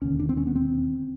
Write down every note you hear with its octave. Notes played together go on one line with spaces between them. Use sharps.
E1 D#2 D3 C#4
D4
C4
C#4
B3
C4